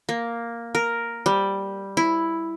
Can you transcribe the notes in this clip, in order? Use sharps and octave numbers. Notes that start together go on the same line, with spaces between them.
A#3
A#4
G3
E4